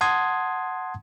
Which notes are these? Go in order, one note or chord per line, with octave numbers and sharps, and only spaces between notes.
F#5 A5 C6 D#6 G#6